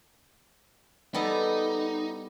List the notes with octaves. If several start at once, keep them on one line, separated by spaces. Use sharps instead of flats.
G3 B3 D#4 A4